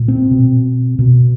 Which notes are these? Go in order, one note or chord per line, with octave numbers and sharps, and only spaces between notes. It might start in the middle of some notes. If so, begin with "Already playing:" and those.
Already playing: A#2
C4
B2
B2